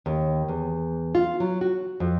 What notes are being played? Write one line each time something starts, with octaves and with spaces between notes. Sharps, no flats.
D#2
E2
F4
F#3
F#4
F2